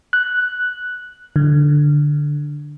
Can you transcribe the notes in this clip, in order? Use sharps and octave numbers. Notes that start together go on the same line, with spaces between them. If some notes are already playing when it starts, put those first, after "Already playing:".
F#6
D3